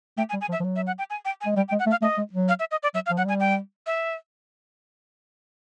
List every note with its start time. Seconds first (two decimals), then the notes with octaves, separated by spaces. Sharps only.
0.18 A3 G5
0.29 G#5
0.33 G3
0.41 G#5
0.49 F3
0.52 E5
0.60 F3
0.64 F#3
0.76 E5
0.87 F#5
0.99 G5
1.10 G#5
1.25 G5
1.41 G#5
1.46 G#3
1.56 G3 G5
1.68 G5
1.72 G#3
1.79 F#5
1.87 A3
1.91 F5
2.02 A3 D#5
2.18 G#3
2.33 F#3
2.49 F5
2.60 E5
2.71 D#5
2.83 D5
2.94 F#3 E5
3.06 F5
3.10 F3
3.17 F#3 F#5
3.26 G3 G#5
3.40 G5
3.86 E5